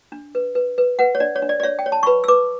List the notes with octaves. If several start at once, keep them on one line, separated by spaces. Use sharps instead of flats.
D4
B4
B4
B4
B4 F#5
C#5
D4 D5
C#5
D4
D5
D5
C#5 E5
G5
C#5
A5
C#6
B4 B5
E6
B4 D6